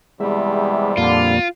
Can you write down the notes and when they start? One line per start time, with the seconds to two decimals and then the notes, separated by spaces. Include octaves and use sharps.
0.20 E2 C3 G3 G#3 E5
0.97 F2 A#2 D3 A#3 F4